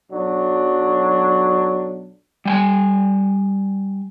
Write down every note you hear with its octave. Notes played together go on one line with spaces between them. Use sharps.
B1 F#3 D4
G3 G5 G#5